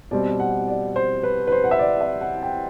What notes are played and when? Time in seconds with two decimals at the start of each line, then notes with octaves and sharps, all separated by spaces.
0.11 B2 G3 C4 D5
0.40 F#5
0.68 D5
0.96 C5
1.23 B4
1.47 B4
1.52 C5
1.64 F#5
1.71 E5
1.79 D5
2.01 E5
2.21 F#5
2.43 G5